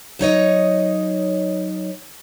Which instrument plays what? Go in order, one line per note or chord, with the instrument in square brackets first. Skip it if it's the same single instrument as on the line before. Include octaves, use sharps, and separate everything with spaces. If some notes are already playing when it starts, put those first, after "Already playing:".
[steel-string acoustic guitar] F#3 D#4 C#5 D#5